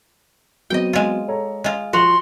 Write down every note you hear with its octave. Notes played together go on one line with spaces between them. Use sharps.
F#3 B3 C4 D#5 G5
G#3 F4
A4 C#5 A#5
G#3 F4
F3 F#4 C6 F7 F#7